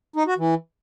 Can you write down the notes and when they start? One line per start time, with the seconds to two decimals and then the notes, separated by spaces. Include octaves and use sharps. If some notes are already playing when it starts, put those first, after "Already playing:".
0.16 D#4
0.27 F#4
0.38 E3